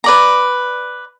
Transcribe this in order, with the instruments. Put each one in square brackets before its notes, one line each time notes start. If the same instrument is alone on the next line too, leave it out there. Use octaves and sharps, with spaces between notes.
[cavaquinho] B4 D5 A#5